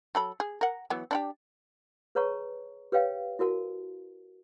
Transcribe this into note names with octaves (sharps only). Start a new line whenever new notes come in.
F#3 A4 B5
G#4
A#4 F#5
E3 F#3 B3
D4 E4 G4
G#4 B4 C#5 A5 A#5 C#6
G4 B4 C#5 F5 G5
E4 F#4 A#4 A5